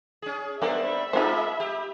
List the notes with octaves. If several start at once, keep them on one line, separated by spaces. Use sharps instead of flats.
C#4 G#4
G3 G#3 B3 C4 D4 A#4 E5 B5
G#3 A#3 D#4 F4 F#4 C5
G4